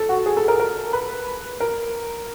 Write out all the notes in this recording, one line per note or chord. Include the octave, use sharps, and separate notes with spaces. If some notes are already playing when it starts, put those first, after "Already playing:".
Already playing: A4
F#4
G#4
A4
A#4
A#4
B4
A#4